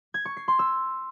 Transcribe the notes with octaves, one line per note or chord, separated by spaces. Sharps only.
G#6
C#6
C7
C6
E6